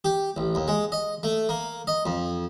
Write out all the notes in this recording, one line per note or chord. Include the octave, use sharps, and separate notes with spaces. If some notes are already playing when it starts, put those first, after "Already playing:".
G4
A1
D#2
G#3
D#5
A3
A#3
D#5
F2